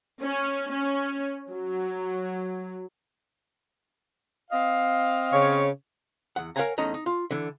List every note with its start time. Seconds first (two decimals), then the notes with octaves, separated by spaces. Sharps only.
0.22 C#4
0.71 C#4
1.51 F#3
4.51 C4 D#5 F5
5.33 C#3 C#5
6.36 E2 F#5
6.56 A#4 C#5 F5 F#5 G#5 A#5
6.78 E2 A3 C#4 D#4 D#5 A#5
6.94 D#4
7.06 F4
7.31 D3 E3